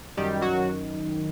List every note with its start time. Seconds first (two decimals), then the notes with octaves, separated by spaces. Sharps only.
0.17 F#2 D#3 G3 G4
0.41 F#3 F#4